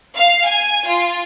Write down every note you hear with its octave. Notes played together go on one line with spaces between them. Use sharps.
F5
G#5
F4